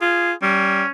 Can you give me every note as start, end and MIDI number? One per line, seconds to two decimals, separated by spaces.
0.01 0.33 65
0.01 0.31 68
0.42 0.83 55
0.42 0.89 61